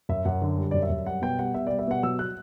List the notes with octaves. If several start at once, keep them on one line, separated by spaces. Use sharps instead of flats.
F#2 E5
F#2 F#5
D3
G3
F#2 D5
E5
F#2
G3 F#5
B2 G5
G3 F#5
B2 E5
G3 D5
E5
B2 F#5
F#3 E6
F#6